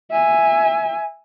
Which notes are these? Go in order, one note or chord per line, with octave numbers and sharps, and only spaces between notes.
E5 G#5